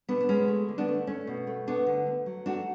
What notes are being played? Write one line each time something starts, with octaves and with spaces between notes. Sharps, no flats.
B2 B3 D4
D4
G#3 C#4
A3
D3
B3 D4
A3
A3 C#4
B2
A3
A3 B3 D4
D3
A3
F#3
A3 D4 F#4